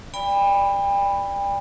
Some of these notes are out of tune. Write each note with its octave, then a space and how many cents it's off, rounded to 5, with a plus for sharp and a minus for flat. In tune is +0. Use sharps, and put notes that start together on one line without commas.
D5 +0 G5 +35 B5 +0